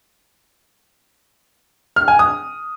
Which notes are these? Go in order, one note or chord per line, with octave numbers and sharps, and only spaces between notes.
F6
G#5
D#6